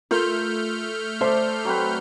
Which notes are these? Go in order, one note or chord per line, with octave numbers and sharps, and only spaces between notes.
A3 F4 A#4 C5 F6 G6
A4 C5 D5 E5
F#3 C4 B4